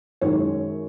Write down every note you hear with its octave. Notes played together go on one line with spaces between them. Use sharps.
F#2 D#3 G#3 C#5